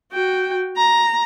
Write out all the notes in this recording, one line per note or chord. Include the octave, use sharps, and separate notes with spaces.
F#4 G5
A#5